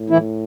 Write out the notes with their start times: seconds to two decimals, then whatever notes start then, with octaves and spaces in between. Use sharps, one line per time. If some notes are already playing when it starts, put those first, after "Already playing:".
Already playing: A2
0.10 E3 E4